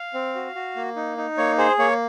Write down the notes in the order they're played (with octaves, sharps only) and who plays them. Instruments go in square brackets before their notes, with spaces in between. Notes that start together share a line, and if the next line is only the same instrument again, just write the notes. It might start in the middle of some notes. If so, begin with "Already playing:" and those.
Already playing: [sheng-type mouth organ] F5
C4
F#4
F#4
A#3
D#4
D#4
A#3 C#5
G#4 C5
A#3 C#5